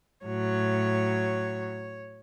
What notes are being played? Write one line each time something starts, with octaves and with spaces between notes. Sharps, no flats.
A2 F#3 C#5